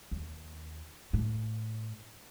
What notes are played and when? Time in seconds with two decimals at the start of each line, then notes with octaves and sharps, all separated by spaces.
0.11 D#2
1.13 A2